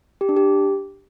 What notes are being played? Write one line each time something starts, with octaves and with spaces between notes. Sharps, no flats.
G4
D4
G4